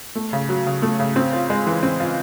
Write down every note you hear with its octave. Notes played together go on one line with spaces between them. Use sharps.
A3
C#3
F#3
C#3
A3
C#3
C4
F4
G#3
E3
C4
F4